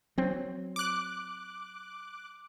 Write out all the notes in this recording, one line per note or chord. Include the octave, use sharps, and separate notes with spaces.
F#3 C4
D6 F#6